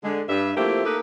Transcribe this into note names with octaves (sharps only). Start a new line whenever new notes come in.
D3 G#3
G2 E5
F3 A3 A#3 C4 E4 G4
A#3 D#4 G4 A4 B4